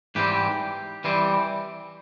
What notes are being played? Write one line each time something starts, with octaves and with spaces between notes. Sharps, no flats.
G#2 E3 G3 C4 G4
E3 G3 C4